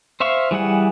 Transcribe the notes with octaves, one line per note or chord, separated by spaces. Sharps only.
C5 E5 F5 C#6
E3 G3 G#4 F#5